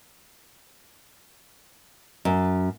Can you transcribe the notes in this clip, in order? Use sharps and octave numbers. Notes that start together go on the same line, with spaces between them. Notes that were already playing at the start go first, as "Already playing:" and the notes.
F#2